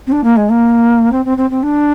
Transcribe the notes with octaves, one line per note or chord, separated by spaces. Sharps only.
C4
D4
A#3
G#3
A#3
C4
C4
C4
C4
D4